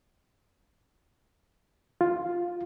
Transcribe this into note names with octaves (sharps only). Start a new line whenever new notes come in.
F4